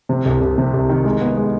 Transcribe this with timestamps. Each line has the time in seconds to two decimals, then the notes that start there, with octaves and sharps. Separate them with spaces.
0.09 C3
0.26 C2
0.41 C2
0.58 C3
0.74 C2
0.89 D#3
1.05 G#3
1.21 B3
1.37 G#3